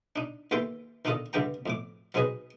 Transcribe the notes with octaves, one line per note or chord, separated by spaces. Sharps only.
D4 D#4
D#2 E3 A4 E5 G5 C6
D#3 D4 D#4 F4 A4 D#5
G2 D3 E3 G4 G5 A#5
F2 A2 D6
F#3 C4 D#4 G#4 B4 D#5